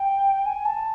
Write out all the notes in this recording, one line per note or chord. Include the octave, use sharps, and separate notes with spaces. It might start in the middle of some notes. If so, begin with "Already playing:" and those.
Already playing: G5
G#5
A5